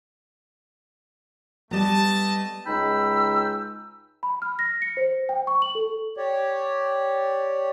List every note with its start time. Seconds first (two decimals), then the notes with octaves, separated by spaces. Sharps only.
1.71 G3 A3 B3 D#5 A5
2.66 C#2 G#3 D#4 G5 B5 E6
4.23 B5
4.42 F6
4.59 A#6
4.82 C#7
4.97 C5
5.29 G5
5.47 C#6
5.62 F#7
5.75 A4
6.17 G4 C#5 D5